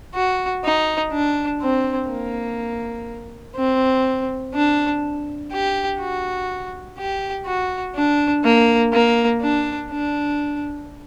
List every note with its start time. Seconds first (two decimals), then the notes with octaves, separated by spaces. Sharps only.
0.15 F#4
0.65 D#4
1.12 D4
1.61 C4
2.10 A#3
3.56 C4
4.54 D4
5.52 G4
6.00 F#4
6.98 G4
7.46 F#4
7.96 D4
8.44 A#3
8.92 A#3
9.41 D4
9.91 D4